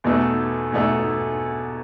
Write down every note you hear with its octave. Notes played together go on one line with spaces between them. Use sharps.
E2 B2 A3 D#4 A4
E2 B2 A3 D#4 A4